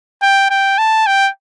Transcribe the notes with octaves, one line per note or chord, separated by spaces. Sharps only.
G5
G5
A5
G5